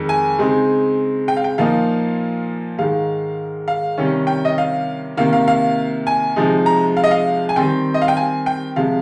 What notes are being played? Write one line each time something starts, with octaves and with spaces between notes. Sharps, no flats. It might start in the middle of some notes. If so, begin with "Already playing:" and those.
Already playing: F2 D#3 G#3
G#5
C#3 G#3 C4 D#4
G5
F5
G5
A#2 F3 A#3 D#4 F5
G#2 D#3 G#3 F5
F5
C3 D#3 G3 C#4
G5
D#5
F5
C3 D#3 A#3 F5
F5
F5
G#5
C3 F3 G#3 D#4
A#5
F5
D#5
F5
G#5
D#3 G3 C4 G5
D#5
F5
G5
G#5
G5
C3 F3 G#3 F5